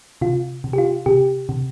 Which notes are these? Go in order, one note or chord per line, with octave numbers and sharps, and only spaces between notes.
C3 F4
C3
G4
F4
C3 G4
C3